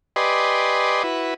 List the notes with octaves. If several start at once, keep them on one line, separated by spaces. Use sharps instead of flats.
G4 B4 D5 D#5 G#5 C6
E4 F#4 B4